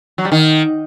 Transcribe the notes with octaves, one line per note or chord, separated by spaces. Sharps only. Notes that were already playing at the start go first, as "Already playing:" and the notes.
F#3
G3
D#3